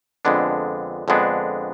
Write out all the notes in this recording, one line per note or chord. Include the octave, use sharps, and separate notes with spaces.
F2 D3 G#3 B3 D4
F2 D3 G#3 B3 D4